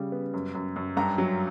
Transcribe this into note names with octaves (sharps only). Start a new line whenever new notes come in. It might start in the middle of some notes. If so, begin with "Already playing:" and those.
Already playing: C#3 G3
B3
F#2
F#2
F#2
G2 A#5
F#3